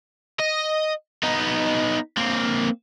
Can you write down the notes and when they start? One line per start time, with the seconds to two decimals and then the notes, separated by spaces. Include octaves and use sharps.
0.40 D#5
1.23 B3 D#4
2.17 A#3 C4